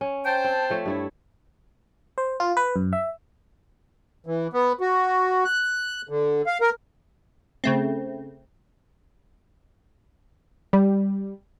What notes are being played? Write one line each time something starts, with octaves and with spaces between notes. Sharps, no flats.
C#4
C5 G5 A5
C4
F3 A3 C#5
G2 E4 C#5
C5
F4
B4
F#2
E5
E3
B3
F#4
F#6
D3
F5
A#4
C#3 A3 C4
G3